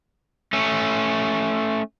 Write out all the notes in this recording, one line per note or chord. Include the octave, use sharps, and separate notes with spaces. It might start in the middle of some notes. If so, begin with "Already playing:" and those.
A3 C#4